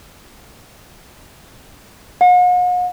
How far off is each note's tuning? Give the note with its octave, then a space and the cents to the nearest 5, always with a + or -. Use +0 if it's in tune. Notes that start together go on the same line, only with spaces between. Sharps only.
F#5 -45